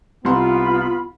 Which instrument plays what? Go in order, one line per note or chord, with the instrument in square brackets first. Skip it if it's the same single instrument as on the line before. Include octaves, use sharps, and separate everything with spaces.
[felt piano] C2 C6 [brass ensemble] B3 [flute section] F4 B5